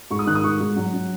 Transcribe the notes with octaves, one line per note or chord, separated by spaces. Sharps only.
G#2 C#6
D#6
D#3 F#6
D#6
G#2 C#6
G#2
F#3
F#3